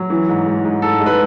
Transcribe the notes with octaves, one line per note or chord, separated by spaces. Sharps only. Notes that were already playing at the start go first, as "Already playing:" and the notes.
Already playing: F#3
E3
G#2
G#2
G#2
G#2 A4
G#3
B4